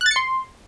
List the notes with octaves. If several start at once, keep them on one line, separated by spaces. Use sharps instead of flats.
F#6
A6
C#7
C6